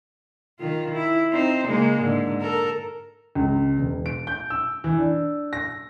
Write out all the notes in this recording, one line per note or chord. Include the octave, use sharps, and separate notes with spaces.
D#3 F4
E4
C4 D#4 C5
C#3 G#3 A#3
G#2 D3
A4 A#4
C#2
E1
D7
G6
E6
E3
D4
A#6